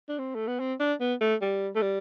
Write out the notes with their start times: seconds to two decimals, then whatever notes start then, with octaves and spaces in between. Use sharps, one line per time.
0.09 D4
0.19 C4
0.35 A3
0.47 B3
0.60 C4
0.79 D4
1.00 B3
1.21 A3
1.41 G3
1.75 A3
1.82 G3